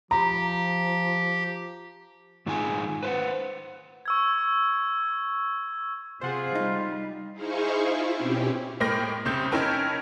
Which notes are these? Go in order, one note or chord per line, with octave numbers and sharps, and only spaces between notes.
F3 G4 A#5
G#2 D#3 D#4 F4 G#4 G#5
B4 C5 D#5 F#5
C#6 E6 G#6
C3 F4 G#4 C5 F#5
G3 D#4
D#4 E4 G#4 C5 F5 C#6
E4 F4
B2 C4 C#4 G4
A2 G#3 A#3 G5 F6 A#6
C2 C#3 C4 G6
C#4 D#4 E4 A#4 G5 A5